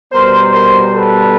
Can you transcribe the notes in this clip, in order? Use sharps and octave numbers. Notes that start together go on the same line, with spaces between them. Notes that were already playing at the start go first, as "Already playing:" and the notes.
B2 G3 B3 A#4 C5
A#4 C5
A4 B4